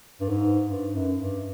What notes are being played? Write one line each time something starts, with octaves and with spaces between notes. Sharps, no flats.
G2
G#2
G2
F#2
G2